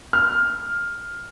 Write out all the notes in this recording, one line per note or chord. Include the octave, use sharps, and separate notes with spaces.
F6